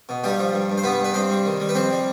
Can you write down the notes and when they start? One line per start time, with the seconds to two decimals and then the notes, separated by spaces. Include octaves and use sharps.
0.09 B2
0.24 G2 G3 G4
0.39 F3
0.53 G2
0.70 G2
0.78 C5
0.84 G3 B3 B4
0.99 G2
1.04 B4
1.14 G2 C4 C5
1.30 G3
1.45 D#3
1.60 G3
1.69 B4
1.75 F2 C4 C5
1.90 G3